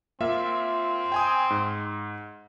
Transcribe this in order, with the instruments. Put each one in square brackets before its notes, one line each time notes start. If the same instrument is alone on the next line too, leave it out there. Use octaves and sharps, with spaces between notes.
[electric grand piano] A#3 F4 E5 [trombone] C4
[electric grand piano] G5 G#5 D#6
G#2